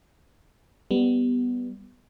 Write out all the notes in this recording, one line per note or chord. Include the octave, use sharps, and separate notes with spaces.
G3 B3